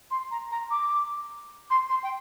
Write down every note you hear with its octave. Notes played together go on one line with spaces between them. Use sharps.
C6
A#5
A#5
D6
C6
C6
G5